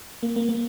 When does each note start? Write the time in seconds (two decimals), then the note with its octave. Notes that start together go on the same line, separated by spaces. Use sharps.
0.23 A#3
0.36 A#3
0.49 A#3